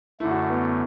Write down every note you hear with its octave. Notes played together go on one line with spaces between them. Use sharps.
F#2 D3 A3 E4
F#4
B3